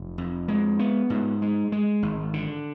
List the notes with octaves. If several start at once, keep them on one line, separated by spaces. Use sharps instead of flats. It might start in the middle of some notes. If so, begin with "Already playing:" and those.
Already playing: F1
F2
G#3
B3
G#2
G#3
G#3
G#1
D3